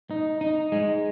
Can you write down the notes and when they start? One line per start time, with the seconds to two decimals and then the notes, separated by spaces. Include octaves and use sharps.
0.11 D#4
0.41 D#4
0.72 G#3